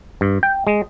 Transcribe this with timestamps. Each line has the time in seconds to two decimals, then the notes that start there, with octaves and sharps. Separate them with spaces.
0.21 G2
0.43 G5
0.67 G#3